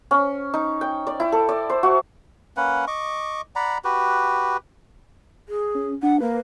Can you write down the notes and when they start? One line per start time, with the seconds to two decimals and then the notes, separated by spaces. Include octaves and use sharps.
0.11 C#4
0.54 D#4
0.81 G5
1.07 D5
1.20 E4
1.32 A4
1.49 D5
1.70 C5
1.83 F#4
2.57 A#3 C#4 B4 F#5
2.87 D#5 C#6 D6
3.56 D5 F#5 A#5 B5
3.84 F#4 G4 B4
5.49 G#4
5.75 C#4
6.03 D4 F#5
6.21 A#3 B4